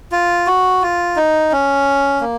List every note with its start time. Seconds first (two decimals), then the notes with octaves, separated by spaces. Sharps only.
0.12 F4
0.47 F#4
0.82 F4
1.16 D#4
1.52 C#4
2.21 A#3